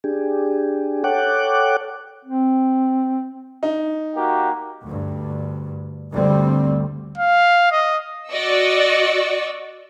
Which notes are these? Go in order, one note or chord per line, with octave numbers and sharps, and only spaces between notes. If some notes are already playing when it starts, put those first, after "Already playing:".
D4 G4 G#4
A4 C#5 F#5 G5 D6 F#6
C4
D#4
A#3 F#4 G4
D2 G2
D2 G2 G3 C4
F5
D#5
F#4 D5 D#5 C#6 E6